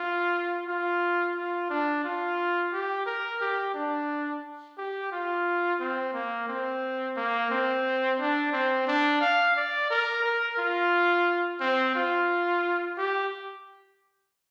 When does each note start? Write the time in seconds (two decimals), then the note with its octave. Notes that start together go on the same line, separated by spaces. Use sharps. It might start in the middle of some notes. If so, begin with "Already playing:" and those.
Already playing: F4
0.67 F4
1.35 F4
1.70 D4
2.04 F4
2.73 G4
3.06 A#4
3.41 G4
3.74 D4
4.78 G4
5.12 F4
5.80 C4
6.14 A#3
6.48 C4
7.17 A#3
7.51 C4
8.20 D4
8.53 C4
8.88 D4
9.21 F5
9.56 D5
9.90 A#4
10.24 A#4
10.58 F4
11.61 C4
11.96 F4
12.98 G4